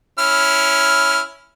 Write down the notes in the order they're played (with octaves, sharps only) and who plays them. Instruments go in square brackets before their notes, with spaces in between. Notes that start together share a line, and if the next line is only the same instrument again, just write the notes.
[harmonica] C#4 E4 F6